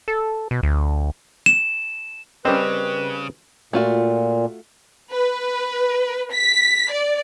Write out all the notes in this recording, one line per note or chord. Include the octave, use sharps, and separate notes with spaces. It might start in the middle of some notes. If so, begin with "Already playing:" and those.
A4
B2
D2
E7
C#3 G3 C4 C#4 A#4 B4 D#5
A#2 A3 F4 F#4
B4
B6
D5